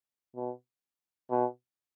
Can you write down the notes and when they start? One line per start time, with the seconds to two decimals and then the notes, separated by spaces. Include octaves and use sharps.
0.36 B2
1.31 B2